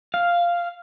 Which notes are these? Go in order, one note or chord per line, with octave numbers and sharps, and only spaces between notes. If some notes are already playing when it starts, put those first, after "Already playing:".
F5